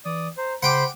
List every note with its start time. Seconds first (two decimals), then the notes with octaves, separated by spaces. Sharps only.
0.05 E3 D5 D#6
0.38 C5 A#5
0.63 C#3 C5 F#5 G5 B5 C6 D6